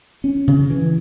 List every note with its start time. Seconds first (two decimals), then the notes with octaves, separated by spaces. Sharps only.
0.24 C#4
0.47 C#3
0.70 E3